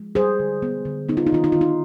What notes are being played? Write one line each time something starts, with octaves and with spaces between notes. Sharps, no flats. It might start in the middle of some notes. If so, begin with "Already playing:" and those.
Already playing: F3 G#3
G3 G#4 C5
D3
B3
D3
B3 D#4
F4
D#4
D#3 F4
D#4
D#3 F4
D#4